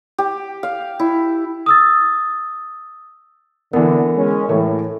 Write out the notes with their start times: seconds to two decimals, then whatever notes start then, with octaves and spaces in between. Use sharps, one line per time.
0.18 G4
0.63 F5
1.00 E4
1.66 D#6 E6 A6
3.73 D3 E3 B3 A#4
4.16 G#3 C#4
4.49 A2 E3 A3 C#5